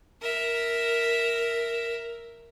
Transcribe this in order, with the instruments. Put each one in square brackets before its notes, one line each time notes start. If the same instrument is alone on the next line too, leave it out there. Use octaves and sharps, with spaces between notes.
[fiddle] A#4 E5